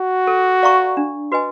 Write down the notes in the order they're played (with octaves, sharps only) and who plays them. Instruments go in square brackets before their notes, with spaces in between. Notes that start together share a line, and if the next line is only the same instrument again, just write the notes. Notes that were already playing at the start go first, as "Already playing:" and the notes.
Already playing: [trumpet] F#4
[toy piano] A4
D5 F5 A#5 C#6
D4
F#4 B4 D#5 G#5